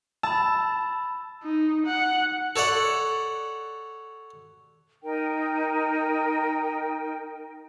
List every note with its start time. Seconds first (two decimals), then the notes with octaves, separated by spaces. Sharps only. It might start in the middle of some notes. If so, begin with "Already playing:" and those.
0.23 A5 B5 E6
1.44 D#4
1.86 F#5
2.56 A4 C#5 D5 F#5
5.03 D#4 A#4 G5